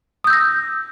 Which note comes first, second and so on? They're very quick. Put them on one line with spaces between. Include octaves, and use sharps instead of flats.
D#6 G6 E6 A#6